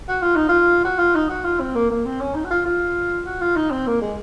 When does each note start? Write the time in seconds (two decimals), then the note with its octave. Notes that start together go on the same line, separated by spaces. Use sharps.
0.09 F#4
0.22 F4
0.36 D#4
0.49 F4
0.84 F#4
0.99 F4
1.15 D#4
1.29 F#4
1.44 F4
1.60 C4
1.75 A#3
1.91 A#3
2.06 C4
2.21 C#4
2.35 D#4
2.45 F#4
2.51 F4
2.66 F4
3.26 F#4
3.42 F4
3.56 D#4
3.71 C4
3.87 A#3
4.02 G#3